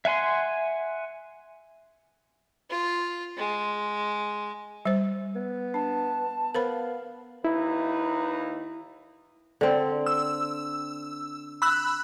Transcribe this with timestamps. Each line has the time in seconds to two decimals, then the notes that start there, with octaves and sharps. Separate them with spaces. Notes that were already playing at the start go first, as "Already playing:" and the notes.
0.05 E5 F#5 G#5 C6
2.70 F4
3.37 G#3
4.85 G3 C5
5.35 B3
5.74 D4 A5
6.55 B3 A#4 C5 F5 B5
7.45 D#2 D#4 E4 B4
9.61 D3 C4
10.06 E6
11.62 B5 E6 F#6